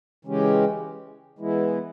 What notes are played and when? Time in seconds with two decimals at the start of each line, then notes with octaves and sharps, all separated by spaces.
0.25 C#3 E3 G#3 C#4 G4
1.39 E3 G#3 B3 E4